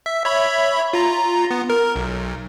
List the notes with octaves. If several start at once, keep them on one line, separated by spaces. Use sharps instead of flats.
E5
C#5 E5 B5
F4 A#5
B3
A#4
B1